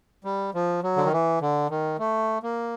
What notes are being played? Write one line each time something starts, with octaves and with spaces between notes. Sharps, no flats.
G3
F3
F#3
D3
D#3
E3
D3
D#3
A3
A#3